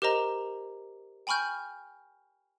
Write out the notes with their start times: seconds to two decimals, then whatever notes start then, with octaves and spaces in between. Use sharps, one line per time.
0.02 G4 A#4 C5 D#5 A#5
1.27 G5 G#5 B5 C#6 F6 G6